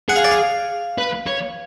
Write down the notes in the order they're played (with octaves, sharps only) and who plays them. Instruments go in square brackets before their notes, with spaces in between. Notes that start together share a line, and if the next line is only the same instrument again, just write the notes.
[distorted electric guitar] G#4 [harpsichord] F#5
[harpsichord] F5
D5
F5
[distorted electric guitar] B4
C#5